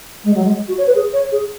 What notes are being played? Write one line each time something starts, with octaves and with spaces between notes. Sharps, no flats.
G#3
F#3
G#3
F#4
C#5
B4
G#4
C#5
G#4